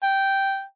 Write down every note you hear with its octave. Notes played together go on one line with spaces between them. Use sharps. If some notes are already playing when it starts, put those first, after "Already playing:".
G5